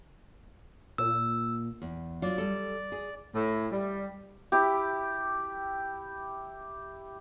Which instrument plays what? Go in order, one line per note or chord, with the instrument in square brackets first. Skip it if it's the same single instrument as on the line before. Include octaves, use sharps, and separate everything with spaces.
[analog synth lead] A#2 [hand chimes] E6
[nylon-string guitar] E2
[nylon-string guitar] F#3 D4 F4 [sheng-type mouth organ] D5
[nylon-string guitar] G3 A4
G#4
[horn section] A2
G3
[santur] E4 G4